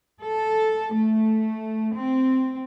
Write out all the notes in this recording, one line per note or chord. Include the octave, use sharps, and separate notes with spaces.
A4
A3
C4